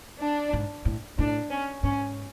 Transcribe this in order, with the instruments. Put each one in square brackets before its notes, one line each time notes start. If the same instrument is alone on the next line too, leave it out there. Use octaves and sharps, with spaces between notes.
[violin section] D4
[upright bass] G#2
A2
[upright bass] A2 [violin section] D4
[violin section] C#4
[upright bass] G#2 [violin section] C#4